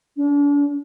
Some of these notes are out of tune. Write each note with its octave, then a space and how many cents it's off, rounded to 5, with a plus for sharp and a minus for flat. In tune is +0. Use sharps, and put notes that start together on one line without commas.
D4 -40